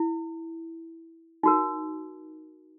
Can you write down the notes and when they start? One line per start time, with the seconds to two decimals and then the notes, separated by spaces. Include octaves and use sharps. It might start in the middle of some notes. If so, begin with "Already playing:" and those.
Already playing: E4
1.43 D#4 F#4 A#4